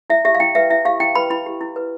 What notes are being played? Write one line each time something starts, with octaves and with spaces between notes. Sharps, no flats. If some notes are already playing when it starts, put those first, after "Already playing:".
E4 E5
G4 E5
F5
E4 G5
B4 E5
E4 E5
G4 F5
E4 G5
B4 B5
E4 B5
G4
E4
B4